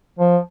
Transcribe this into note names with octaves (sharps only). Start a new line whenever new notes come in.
F3